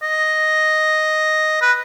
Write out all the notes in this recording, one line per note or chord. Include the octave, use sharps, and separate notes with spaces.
D#5
B4